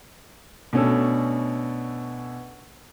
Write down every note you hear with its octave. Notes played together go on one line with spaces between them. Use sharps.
B2 A3 C#4 D4 A4